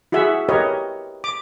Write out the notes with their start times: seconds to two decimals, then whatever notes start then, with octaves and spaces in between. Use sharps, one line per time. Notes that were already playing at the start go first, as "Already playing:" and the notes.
0.12 E4 F#4 G#4 E5 F#5
0.49 G4 A#4 B4 C#5 D#5
1.24 D6